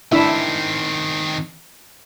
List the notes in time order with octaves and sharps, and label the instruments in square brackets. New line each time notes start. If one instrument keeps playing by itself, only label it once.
[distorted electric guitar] D#3 C4 [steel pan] D4 E4 E5